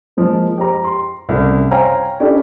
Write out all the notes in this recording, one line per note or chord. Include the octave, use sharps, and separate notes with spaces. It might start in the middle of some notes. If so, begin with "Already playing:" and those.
F3 G#3 A#3
G4 C5 A#5
C6
C2 C#3 A3
C5 C#5 F5 G5 G#5 A#5
C#4 D4 E4 G4 A4